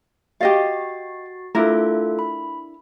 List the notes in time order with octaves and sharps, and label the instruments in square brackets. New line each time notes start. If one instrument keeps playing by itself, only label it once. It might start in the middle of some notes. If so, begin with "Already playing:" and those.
[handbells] F#4 A6 C7 [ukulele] G4 D#5 F5
[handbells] A3 F4 A4 [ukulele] D4 E4 A#4
[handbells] B5